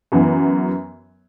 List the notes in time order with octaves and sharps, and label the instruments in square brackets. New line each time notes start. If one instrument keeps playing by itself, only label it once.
[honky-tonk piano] F#2 E3 B3